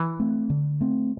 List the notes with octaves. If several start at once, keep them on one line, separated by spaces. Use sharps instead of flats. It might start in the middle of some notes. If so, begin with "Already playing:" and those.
Already playing: E3
A3 C4
D3
A3 C4